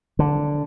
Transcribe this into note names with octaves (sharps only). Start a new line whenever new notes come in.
D3